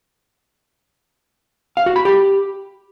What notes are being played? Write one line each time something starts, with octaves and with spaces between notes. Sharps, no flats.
F5
F#4
B5
G4